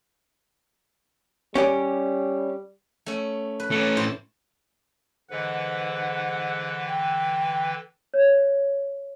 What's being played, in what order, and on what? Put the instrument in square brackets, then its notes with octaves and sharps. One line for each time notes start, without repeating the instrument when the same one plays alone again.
[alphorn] G3 [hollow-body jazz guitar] C#4 G4 D5
[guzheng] A3 C#4
B4
[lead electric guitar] A3 C#4
[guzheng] A2 C5 A5
[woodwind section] G#2 F#5 [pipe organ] D3 E3 B4
[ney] G5
[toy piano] C#5